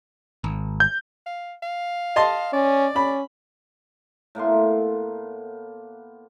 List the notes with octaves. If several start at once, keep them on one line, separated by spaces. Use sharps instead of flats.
G#1
G6
F5
F5
D#5 A5 C6
C#4 D5
C#4 B5
A2 A#3 B3 C6